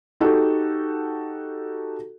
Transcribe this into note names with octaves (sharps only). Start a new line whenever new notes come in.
D#4 F#4 G4 A4